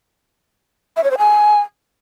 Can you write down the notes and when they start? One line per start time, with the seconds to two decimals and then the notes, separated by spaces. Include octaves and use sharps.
0.97 E5
1.04 C#5
1.11 C5
1.18 G#5